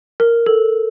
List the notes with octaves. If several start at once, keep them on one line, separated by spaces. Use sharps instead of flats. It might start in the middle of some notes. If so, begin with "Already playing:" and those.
A#4
A4